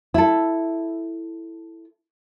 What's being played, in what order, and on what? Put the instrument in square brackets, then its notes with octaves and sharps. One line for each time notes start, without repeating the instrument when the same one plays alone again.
[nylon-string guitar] E4 A4